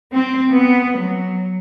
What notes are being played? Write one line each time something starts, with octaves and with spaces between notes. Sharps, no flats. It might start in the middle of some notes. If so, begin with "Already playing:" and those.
C4
B3
F#3